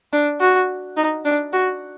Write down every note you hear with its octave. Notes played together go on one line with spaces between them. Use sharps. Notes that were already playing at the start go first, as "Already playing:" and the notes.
D4
F#4
D#4
D4
F#4